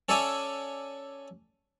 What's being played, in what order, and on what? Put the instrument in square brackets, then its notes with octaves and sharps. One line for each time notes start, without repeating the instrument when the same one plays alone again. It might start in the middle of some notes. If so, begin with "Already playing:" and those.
[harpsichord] C#4 A4 C#5 D5 E5 G#5